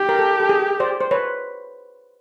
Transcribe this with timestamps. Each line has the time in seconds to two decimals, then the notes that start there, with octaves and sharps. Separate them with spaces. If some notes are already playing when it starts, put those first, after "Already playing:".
Already playing: G4
0.09 A#4
0.19 A4
0.40 A4
0.49 G#4
0.80 C5 D5
1.01 C5
1.11 B4 C#5